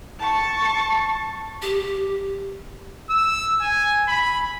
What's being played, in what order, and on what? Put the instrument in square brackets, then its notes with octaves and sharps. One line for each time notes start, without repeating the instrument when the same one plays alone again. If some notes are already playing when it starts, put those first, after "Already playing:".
[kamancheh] A5 C#6
[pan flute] G4
[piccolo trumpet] E6
G#5
B5